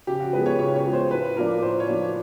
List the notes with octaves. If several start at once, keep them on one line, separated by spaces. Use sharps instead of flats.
C#3 G4
F#4
F3 G#3 B3 B4
C#5
C#3 C#5
C#5
F3 G#3 B3
C5
A2 B4
F3 A#3 D4 A#4
A2 C5
C#5
F3 A#3 D4